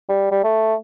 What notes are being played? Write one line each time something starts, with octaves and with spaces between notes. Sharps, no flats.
G3
G3
A3